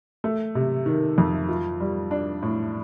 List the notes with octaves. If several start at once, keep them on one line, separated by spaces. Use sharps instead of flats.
A3
C3
D#3
F2
F4
G3
D4
A2